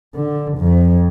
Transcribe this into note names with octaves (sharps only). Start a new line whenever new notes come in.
D3
F2